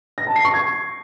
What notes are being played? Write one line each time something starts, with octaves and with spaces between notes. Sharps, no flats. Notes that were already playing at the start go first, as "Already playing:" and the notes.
A#6
A5
C7
C#6
G#6